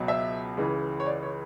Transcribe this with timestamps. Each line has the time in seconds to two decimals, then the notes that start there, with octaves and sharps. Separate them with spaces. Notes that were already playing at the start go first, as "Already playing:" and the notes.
Already playing: C#2 B2 F#3
0.08 E5
0.57 C#2 C#3 E3
1.00 C#5
1.06 D5
1.23 C#5